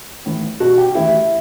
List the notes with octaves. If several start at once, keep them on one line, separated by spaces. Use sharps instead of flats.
A2 E3
B2 F#4 F#5
G4 G5
A2 E3 E4 E5